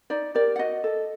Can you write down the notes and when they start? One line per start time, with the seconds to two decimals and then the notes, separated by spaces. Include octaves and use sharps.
0.10 D#4 D5
0.35 G4 A#4 D5
0.56 F#5
0.59 F#4 D#5
0.84 A4